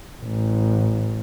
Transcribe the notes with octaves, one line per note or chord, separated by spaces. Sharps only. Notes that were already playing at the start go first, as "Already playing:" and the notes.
A1